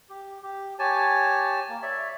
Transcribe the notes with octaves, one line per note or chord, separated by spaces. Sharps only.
G4
G4
G4 C#5 G#5 A5
A#3
C#5 D5 E5